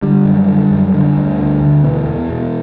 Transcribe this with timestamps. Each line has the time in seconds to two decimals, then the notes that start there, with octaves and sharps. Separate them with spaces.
0.03 D3 G3
0.25 F#2
0.48 D3
0.71 F#2
0.94 D3
1.17 D2
1.39 D3
1.61 D2
1.84 B2 E3
2.06 E2
2.30 B2